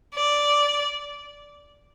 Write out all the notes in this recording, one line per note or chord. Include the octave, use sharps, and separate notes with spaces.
D5